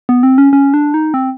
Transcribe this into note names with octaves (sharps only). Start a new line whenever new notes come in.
B3
C4
C#4
C#4
D4
D#4
C4